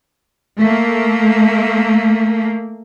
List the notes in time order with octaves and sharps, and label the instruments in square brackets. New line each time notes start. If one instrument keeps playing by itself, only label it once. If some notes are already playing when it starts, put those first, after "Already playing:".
[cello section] A3 A#3